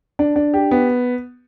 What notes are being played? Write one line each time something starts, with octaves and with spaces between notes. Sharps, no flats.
D4
D4
G4
B3